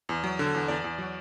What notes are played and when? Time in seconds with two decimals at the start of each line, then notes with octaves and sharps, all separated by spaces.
0.09 E2
0.24 F#3
0.39 D3
0.54 E2
0.68 E2 D5
0.84 E2
0.98 F#3